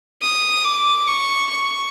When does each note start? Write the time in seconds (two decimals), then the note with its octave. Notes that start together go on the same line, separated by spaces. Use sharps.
0.22 D#6
0.64 D6
1.07 C#6
1.50 C#6